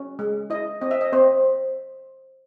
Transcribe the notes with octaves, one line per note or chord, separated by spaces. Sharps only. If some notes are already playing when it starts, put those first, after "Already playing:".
Already playing: C#4
G#3
E4 D#5
C4 D#5
E5
D#5
C4 C5